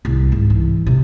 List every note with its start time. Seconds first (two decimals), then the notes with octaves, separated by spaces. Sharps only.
0.05 C2
0.32 G#2
0.50 E3
0.86 C3